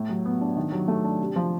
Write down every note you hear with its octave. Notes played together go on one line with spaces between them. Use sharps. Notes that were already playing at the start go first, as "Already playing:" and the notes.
Already playing: A2
F#3
B3
D4
D#3
F#3
A3
D4
C3
F3